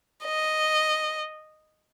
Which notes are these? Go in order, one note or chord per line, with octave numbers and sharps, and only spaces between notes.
D#5